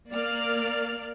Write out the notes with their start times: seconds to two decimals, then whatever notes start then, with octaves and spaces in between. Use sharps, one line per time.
0.11 A#3 D5 F6